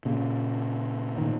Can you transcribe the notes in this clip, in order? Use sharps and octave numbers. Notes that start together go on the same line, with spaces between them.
A#2 C#3
A#2 D#3